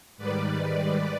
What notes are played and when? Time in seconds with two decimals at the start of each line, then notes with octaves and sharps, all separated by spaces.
0.17 G#2 D#3 G3 B4 D5
0.61 B4 D5